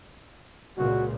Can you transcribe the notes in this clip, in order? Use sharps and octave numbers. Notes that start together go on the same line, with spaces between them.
C#2 A#2 C#3 F#4